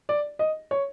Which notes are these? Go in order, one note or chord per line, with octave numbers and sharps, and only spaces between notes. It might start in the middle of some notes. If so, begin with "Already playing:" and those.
D5
D#5
C#5